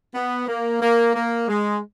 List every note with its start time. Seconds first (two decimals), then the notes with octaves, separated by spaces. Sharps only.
0.14 B3
0.47 A#3
0.81 A#3
1.14 A#3
1.48 G#3